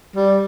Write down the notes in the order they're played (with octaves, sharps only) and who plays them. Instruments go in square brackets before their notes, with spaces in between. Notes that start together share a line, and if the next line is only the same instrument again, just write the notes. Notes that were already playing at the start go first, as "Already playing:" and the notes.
[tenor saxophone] G3